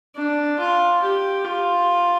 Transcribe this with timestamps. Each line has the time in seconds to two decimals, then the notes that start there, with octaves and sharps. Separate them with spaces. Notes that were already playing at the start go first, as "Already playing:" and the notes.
0.16 D4
0.59 F4
1.03 G4
1.45 F4